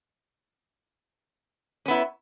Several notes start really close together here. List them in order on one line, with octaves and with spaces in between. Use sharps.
C#4 B3 E4